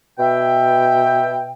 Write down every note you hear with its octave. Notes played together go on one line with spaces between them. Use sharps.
B2 E5 G5